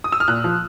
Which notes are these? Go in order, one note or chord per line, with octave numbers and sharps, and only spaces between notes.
D#6
E6
F6
A#2 F#6
F3